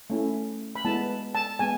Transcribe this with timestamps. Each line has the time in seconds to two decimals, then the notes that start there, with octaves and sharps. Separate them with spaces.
0.10 A3 C#4 E4
0.76 B5
0.85 G#3 B3 E4 A5
1.35 A5
1.59 G#3 B3 G#5